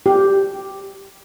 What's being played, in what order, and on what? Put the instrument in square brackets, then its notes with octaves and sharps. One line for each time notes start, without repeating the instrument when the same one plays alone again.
[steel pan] G4